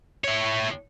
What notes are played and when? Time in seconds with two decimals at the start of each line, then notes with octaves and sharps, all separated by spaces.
0.24 E4 C#5